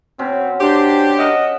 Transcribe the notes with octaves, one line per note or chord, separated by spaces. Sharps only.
B2 C4 C#4
D4 G4 C5
A#4 D#5 E5 F#5